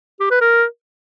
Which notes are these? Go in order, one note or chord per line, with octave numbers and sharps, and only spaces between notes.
G4
B4
A#4